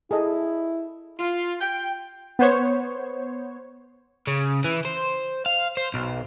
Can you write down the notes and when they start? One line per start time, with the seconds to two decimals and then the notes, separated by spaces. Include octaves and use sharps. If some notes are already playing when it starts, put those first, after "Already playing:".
0.11 E4 G#4 A4 D#5
1.20 F4
1.61 G5
2.39 B3 C5 C#5
4.27 C#3
4.64 E3
4.85 C5
5.46 F5
5.77 C5
5.94 B1